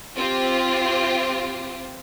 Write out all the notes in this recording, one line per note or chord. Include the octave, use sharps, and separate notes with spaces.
C4 F4 G4